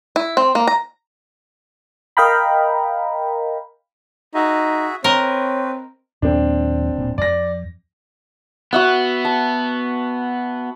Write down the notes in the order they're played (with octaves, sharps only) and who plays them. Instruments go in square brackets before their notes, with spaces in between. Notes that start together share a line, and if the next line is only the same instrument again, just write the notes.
[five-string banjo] E4
C4
A#3
A#5
[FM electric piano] A#4 D#5 F5 G5 A#5 B5
[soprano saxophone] D#4 [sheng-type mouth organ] F#4 G#4 E5
[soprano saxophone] C4 [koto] A#4 D#5 [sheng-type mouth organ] B4 [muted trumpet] C#5
[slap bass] D#2 A#2 F#3 [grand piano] C4 D4
[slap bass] D1 A#2
[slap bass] F2 [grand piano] D5 A#6
[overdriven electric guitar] B3 [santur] F#4 E5 F#5
[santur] A5